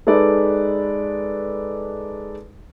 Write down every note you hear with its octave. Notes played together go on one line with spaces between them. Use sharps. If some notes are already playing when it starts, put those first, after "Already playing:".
G#3 D#4 A4 B4 D5